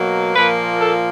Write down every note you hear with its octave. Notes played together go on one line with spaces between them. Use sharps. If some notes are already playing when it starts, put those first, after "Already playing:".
Already playing: B2 F#3 A#3
A#2 F3 A#3 B4
A4